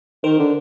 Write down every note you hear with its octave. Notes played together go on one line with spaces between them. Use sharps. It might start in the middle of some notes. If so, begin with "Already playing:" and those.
D#3 A#4 C5
D3